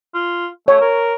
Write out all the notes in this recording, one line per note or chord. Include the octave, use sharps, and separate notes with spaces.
F4
A3 C#5
A#4